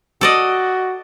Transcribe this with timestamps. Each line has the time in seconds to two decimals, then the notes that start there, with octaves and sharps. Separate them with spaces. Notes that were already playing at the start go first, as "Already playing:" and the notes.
0.21 F#4 A4 D5 D#5